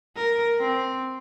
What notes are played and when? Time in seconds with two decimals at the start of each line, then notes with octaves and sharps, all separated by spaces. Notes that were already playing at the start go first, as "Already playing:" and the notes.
0.16 A#4
0.59 C4